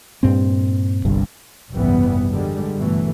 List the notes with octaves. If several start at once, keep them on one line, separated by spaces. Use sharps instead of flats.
G2 A#2 C4
G1 C2 G2
F#1 C2 G#2 E3 G3 B3
D3 G3 G#3
G1 B2 E3 A3